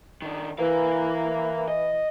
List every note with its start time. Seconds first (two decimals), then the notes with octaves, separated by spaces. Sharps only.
0.22 D#3 D4
0.59 E3 A#4 F5
1.68 D#5